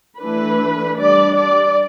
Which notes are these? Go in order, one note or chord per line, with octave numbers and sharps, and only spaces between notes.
E3 A3 D4 B4
G3 D4 D5
D5